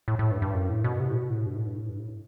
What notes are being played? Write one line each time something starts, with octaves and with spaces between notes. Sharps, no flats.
A2
A2
G2
G2
F#2
A2
B2
C3
A2
B2
A2
G2
A2
G2
A2
G2
A2